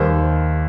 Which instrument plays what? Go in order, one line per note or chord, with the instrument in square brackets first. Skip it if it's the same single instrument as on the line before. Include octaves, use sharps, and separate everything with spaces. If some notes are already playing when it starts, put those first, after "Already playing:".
Already playing: [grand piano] D#2 D#3 G3 C5